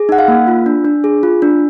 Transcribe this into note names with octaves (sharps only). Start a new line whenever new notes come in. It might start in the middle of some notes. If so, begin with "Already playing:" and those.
Already playing: G#4
D#4 F#5
F5
A#3
F4
D4
D4
G#4
F4
D4